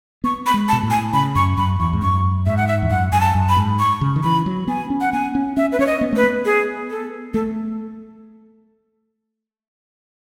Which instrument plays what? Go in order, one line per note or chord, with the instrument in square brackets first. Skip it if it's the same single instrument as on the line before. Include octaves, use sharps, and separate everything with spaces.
[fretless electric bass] B3 [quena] C#6
[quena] B5
[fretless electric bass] G#3
[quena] A5
[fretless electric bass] B2
A2
[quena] G#5
[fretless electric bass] C#3 [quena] B5
[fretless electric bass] F#2 [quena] C#6
[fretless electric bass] F#2 [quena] B5
[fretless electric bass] E2 [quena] C#6
[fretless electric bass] G#2
[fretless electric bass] F#2 [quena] C#6
[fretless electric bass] G#2 [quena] E5
[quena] F#5
E5
[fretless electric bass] E2
[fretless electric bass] F#2 [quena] F#5
[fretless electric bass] F#2 [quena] G#5
[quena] A5
[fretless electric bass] F#2
[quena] B5
[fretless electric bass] G#2
[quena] C#6
[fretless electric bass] C#3
D#3
[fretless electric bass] E3 [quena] B5
[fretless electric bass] F#3
[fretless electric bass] B3 [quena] G#5
[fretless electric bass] C#4
[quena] F#5
[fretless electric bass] B3 [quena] G#5
[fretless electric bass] C#4
[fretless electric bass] C#4 [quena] E5
[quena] B4
[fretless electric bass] C#4 [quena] C#5
[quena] D#5
[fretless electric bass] B3
[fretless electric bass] A3 [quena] B4
[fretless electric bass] B3
[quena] G#4
A4
[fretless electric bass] A3 [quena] A4